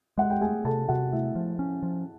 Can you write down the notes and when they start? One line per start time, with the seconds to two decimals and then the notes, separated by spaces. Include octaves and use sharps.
0.18 G#3 F#5
0.30 G5
0.41 A3 G#4 G#5
0.65 C3 A4 A5
0.88 C3 F#4 F#5
1.12 A3 E4 E5
1.35 F3
1.59 C#4
1.83 F3